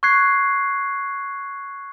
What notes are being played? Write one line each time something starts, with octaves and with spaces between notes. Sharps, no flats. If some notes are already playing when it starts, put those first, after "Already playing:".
C#6 F#6 G#6 C7